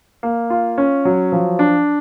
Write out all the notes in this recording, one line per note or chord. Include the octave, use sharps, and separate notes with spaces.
A#3
F4
C#4
F#3
F3
D4